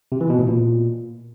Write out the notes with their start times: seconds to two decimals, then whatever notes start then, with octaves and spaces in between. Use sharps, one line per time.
0.12 C3
0.21 E3
0.30 B2
0.39 A2
0.48 A#2